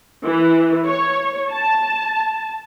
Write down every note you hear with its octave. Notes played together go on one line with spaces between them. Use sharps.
E3
C#5
A5